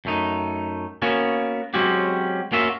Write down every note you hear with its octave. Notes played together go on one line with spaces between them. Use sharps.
F#2 A3 D#4
A#3 B3 C#4 F#4
F#3 G#3 C4 C#4 F#4 G4
A#3 C#4 F4 F#4 E5